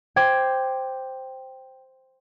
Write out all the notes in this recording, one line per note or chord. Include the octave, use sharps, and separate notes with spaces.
C5 G5 D6 G#6